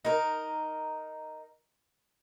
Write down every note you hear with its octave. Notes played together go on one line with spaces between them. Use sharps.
D#4 A#4